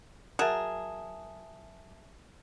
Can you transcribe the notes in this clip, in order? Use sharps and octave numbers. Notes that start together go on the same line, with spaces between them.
F#3 G#4 A#4 E5 A5 E7